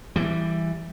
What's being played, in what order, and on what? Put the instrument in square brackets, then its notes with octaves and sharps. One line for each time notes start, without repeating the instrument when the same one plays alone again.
[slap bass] E3 G3